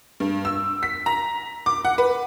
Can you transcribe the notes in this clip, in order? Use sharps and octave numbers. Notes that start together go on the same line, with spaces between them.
G2
E6
B6
A#5
D6
F#5
B4